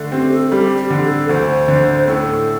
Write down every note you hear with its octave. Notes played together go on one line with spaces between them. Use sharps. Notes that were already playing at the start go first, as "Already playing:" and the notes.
Already playing: D3 A3
C4 G4
A4
G3 G4
G4
D3
A4
D2 C5
D3
A2 A4